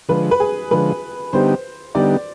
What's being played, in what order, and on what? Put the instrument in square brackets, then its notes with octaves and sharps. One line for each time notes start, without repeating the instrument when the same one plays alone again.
[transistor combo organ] D3 F3 G#3 [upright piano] B4
[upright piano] B4
G#4
[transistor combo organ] D3 F3 G#3 [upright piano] B4
[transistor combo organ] D3 G3 B3 D#4 G4 [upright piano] C5
[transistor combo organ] D3 G3 B3 D#4 G4 [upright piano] D5